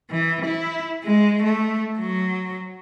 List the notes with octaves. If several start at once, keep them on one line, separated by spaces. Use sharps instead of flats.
E3
E4
G#3
A3
F#3